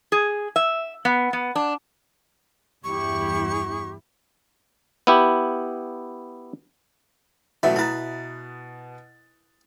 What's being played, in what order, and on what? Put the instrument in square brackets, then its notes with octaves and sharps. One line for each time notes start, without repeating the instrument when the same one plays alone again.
[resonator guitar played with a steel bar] G#4
E5
B3
B3
D4
[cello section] E2 G2 E4 [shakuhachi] G4 [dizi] C#6
[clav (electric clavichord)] B3 E4 G4
[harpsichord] A1 E3 D5 [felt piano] B2 F#3 A3 [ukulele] E5 [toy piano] F#5
[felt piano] B2 A6 [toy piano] E4 A#5 [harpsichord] G#4 B4